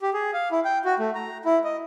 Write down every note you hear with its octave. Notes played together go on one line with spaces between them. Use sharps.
G4
G#4
F5
E4
G5
F#4
A3
A#5
E4
D#5